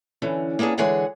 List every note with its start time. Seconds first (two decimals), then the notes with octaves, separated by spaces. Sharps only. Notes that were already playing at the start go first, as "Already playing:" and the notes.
0.22 D3 E3 C#4
0.59 A#3 B3 C#4 D4 G#4
0.78 D3 E3 G#3 G#4 C#5 F#5